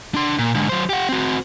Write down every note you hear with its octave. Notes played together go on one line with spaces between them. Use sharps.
D4 C6
A#2
G#2 D3
F#3 C5
G4 F#5
C4 F#4